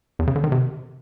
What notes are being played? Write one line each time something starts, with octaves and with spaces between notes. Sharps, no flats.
E2
C#3
D3
D#3
C3